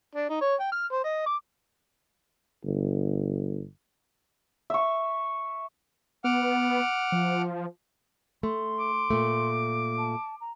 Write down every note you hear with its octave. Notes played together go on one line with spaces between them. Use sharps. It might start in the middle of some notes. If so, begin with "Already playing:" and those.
D4
D#4
C#5
G5
F6
C5
D#5
D6
G1
E5 C#6
B3 F#5 D6 F6
F3
A3 C6
D6
A#2 A3
A5
A#5